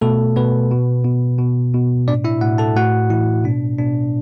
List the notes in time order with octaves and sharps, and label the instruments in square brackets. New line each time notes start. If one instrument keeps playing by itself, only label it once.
[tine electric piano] B2 A3 A4
B2 B3 B4
B2
B2
B2
B2
A2 D4 D5
E4 E5
A2 F#4 F#5
A4 A5
A2 F#4 F#5
A2 E3 E4
B2 D4
B2 D4